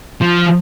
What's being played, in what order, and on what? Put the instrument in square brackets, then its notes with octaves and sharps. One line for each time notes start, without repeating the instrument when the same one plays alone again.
[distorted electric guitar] F3